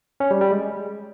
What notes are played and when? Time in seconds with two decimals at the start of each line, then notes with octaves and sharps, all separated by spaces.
0.20 C#4
0.31 G3
0.41 G3
0.51 G#3